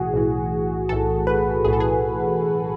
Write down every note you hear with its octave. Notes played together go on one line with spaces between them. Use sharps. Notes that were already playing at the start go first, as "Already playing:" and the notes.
Already playing: B1 A2 E3 F#4 G#4
B1 A2 E3
B1 A2 E3 A4
B4
B1 A2 E3 G#4
A4
G#4